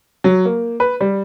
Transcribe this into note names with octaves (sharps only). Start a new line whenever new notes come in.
F#3
A#3
B4
G3